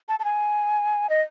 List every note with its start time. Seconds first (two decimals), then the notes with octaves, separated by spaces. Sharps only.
0.09 A5
0.20 A5
0.24 G#5
1.10 D#5